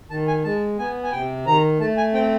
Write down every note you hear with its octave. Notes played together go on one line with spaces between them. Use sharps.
D#3 A5
G#5
G#3 A5
B3 G#5
G#5
C3 G5
D#3 A#5
A3 A5
G#5
C4 G5